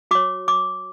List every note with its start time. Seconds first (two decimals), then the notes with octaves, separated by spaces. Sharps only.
0.11 F#4 C#5 D6
0.48 D6